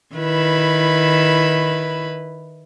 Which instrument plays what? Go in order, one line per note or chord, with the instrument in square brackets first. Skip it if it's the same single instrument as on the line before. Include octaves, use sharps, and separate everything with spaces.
[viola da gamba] D#3 E4 B4